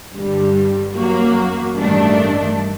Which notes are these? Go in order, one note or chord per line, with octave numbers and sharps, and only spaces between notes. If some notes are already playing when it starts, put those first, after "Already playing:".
G2 D3 G3
F#2 F#3 A#3 F#4
A1 G2 D#3 A3 D4